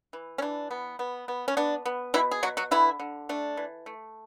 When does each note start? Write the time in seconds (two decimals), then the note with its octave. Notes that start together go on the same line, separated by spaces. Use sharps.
0.13 E3
0.38 C#4
0.42 E3 D4
0.71 B3
0.99 B3
1.28 B3
1.48 C#4
1.57 B3 D4
1.85 B3
2.14 B2 E3 E4
2.31 G#4
2.43 B2 F#3 F#4
2.57 F#3 F#4
2.71 D3 E3 E4
3.00 D3
3.29 A3 D4
3.57 E3
3.86 A3